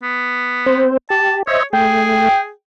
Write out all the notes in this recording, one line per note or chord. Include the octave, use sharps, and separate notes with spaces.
B3
C4 C5
G4 A5
C5 C#5 D#5 E5
A3 G#4 G5